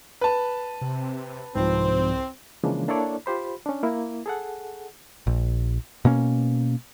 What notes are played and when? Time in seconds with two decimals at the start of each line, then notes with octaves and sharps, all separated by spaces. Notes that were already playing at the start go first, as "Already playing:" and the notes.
0.21 B4 A5
0.81 C3
1.55 C2 G#2 F3 C4
2.64 C#3 E3 F3 G#3 A#3 D4
2.88 A#3 D4 E4 A4 C#5 D5
3.26 F4 G4 C5 B5
3.66 C#4 D4
3.83 A#3 E4
4.26 G#4 A4 F#5
5.27 A#1
6.05 B2 A#3 C#4